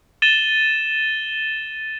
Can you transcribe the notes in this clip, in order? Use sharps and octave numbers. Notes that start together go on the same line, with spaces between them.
A6 D#7 E7 G7